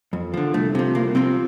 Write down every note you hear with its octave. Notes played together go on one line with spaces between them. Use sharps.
F2
D3 F3
C2 A3
C3 F3
C2 A#3
C3 F3 C4